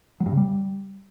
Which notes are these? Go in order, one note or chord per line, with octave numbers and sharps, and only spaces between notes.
F#3
G2
C#3
G3